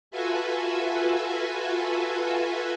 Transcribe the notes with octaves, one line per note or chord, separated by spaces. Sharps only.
F4 F#4 A4 B4 E5 G#5